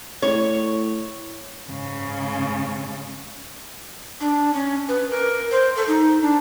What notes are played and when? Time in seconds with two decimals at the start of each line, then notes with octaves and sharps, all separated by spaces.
0.22 A2 C#5
1.70 G#2 C#3
4.20 D4
4.53 C#4
4.89 B4
5.10 A#4
5.51 C5
5.76 A4
5.88 D#4
6.22 D4